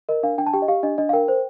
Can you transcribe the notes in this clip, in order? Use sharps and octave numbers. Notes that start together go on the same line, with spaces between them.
A#4 D#5
D4 F5
D4 G5
A5
G4 G5
D#5
G4 F5
D4 D#5
D4 D#5
F5
A#4 G5
C5